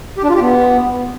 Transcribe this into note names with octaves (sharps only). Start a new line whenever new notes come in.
G4
D4
F4
G4
B3